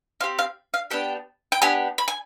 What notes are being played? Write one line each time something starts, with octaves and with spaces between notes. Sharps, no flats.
C4 G4 F5
F5
F5
B3 D4 G4 G5
G5
B3 D4 G4 G#5
B5
G#5